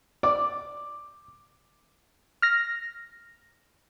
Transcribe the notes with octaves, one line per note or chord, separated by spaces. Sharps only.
D5 D6
F6 A#6